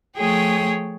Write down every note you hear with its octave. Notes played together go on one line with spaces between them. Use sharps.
F3 A3 G#4 C#5 G5 D#6